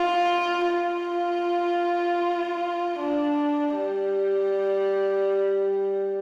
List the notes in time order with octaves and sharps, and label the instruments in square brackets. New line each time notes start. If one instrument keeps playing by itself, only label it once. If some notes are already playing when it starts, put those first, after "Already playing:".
Already playing: [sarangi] F4
F4
D4
G3